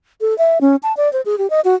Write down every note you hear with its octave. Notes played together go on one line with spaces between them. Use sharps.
A4
E5
C#4
A5
D5
C5
G#4
G4
D#5
F#4